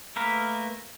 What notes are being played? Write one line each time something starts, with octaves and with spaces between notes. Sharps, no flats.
A3 A#3 A#4 B4